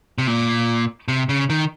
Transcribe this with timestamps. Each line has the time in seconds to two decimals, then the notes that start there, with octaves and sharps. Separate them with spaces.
0.18 C3
0.27 A#2
1.08 C3
1.29 C#3
1.50 D#3